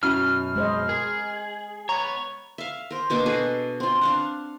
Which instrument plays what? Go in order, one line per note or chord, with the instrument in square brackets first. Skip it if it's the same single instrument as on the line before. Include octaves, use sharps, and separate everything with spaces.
[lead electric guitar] F#2 B2 [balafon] C#4 E4 F#4 [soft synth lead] F6
[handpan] G#3 C5 D#5
[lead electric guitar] G#4 [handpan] A#4
[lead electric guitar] B3 C#5 [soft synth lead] A#5
[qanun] E5 F5
A#4 C5
B2 A#3 D4 D6
F#4 G#4 A4
C4 F4
D4 F5 F#5